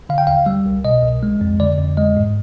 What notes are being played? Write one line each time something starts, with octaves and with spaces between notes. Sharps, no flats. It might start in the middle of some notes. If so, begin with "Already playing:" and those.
D3 F5
G5
D#2 F5
G3
C2
B2 D#5
C2
G#3
F2
D3 D5
F2
G#3 D#5
G#2